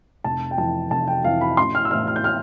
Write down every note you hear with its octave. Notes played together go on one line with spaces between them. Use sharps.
F1 A5
G5
F2 E3 A5
F1 A5
G5
F2 E3 F5
B5
A1 C6
F6
E6
A2 E3 F6
F6
G6
F6